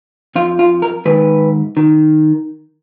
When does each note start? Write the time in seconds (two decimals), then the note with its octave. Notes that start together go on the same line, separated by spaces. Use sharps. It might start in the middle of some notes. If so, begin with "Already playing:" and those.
0.36 F2 F3 F4
0.59 F4
0.82 A#4
1.05 G#2 D#3 B4
1.77 D#3